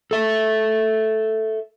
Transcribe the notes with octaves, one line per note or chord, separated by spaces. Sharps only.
A4 E5